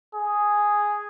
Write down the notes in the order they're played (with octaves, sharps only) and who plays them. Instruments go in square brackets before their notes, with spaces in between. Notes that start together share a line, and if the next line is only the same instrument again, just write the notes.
[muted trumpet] G#4